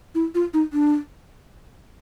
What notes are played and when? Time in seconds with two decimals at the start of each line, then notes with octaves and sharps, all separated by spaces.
0.15 E4
0.35 F4
0.54 D#4
0.73 D4